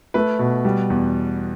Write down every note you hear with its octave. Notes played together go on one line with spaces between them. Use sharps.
A3 B4
B2
G3
E2